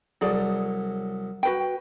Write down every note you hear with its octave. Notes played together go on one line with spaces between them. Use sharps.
C2 F#3 G#4 A4 D5
F#4 B4 G5